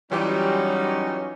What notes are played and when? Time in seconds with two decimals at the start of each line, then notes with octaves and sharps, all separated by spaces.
0.12 E3 F#3 G3 C#4 D#4 F4 G4